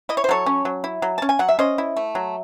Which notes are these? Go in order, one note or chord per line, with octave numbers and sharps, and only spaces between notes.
E4 D#5
C#5
C5
F#3 A4 C#5
C#4
F#3
E4
F#3
C#4 A5
G#5
F#3 F#5
E5
C#4 C5 D#5
E4
A3
F#3